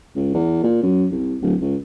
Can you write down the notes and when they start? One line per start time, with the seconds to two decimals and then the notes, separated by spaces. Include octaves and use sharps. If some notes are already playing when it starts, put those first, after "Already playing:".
0.15 C#2
0.34 E2
0.63 A#2
0.82 F#2
1.11 C2
1.42 D1
1.61 C#2